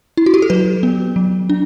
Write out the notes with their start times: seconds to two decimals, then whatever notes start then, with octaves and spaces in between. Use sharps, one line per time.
0.17 E4
0.26 F#4
0.34 G4
0.42 A4
0.50 F#3 B4
0.83 B3
1.16 F#3
1.50 D4